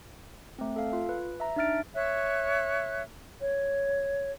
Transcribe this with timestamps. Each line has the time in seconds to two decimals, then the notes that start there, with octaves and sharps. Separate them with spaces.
0.59 A3 C4
0.76 A4 F5
0.93 F4
1.09 B4
1.40 E5 A#5
1.56 D4 D#4 E5 F6 A6 D7
1.94 C#5 E5 F#6
3.41 C#5